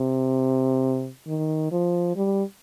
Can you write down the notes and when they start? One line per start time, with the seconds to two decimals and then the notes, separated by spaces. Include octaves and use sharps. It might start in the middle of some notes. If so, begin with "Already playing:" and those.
Already playing: C3
1.27 D#3
1.72 F3
2.16 G3